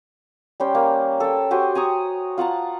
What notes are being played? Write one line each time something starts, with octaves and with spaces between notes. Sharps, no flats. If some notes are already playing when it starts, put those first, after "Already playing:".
G3 C#4 C5 G5
A#3
A4 G5
F#4 G4 C5 G#5
G#5 A#5 C#6 D#6
F4 F#5 A5 A#5